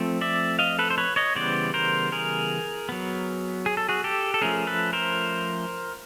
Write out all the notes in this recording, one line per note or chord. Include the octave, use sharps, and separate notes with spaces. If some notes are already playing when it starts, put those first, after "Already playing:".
Already playing: F3 A3 C4
D5 E5
D#5 F5
A4 B4
C5
B4 C#5
C#5 D#5
C#3 E3 G3 B3 C5 D5
A#4 C5
G#4 A#4
F#3 B3
G#4
A4
F#4 G#4
G4 A4
A4
F3 A3 C#4 G#4 A#4
A4 B4
A#4 C5